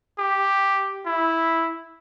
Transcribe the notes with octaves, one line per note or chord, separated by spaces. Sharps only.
G4
E4